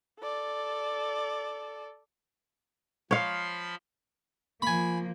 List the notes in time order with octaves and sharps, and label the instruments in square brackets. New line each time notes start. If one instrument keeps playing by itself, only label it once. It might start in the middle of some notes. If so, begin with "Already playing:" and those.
[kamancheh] A4 D5
[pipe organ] F3 B5 C6 [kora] C#5 F5
[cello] F3 A#3 [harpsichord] G#5 B5